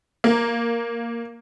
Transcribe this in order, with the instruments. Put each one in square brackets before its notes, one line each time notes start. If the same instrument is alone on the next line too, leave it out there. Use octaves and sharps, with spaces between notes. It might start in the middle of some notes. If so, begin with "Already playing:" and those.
[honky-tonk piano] A#3